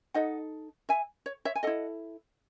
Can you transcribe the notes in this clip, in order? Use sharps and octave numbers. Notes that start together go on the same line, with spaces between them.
D#4 A4 D#5 F#5
E5 G#5
C#5
C#5 E5
G#5
E4 A4 D#5 F#5